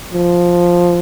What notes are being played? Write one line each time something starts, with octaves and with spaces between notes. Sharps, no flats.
F3